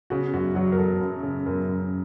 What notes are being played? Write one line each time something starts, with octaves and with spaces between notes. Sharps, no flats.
C#3 F#4
F#2 F#4
F#3 F#4
A#4
F#3 A4
F#2
C#3
F#2 A#4
F#2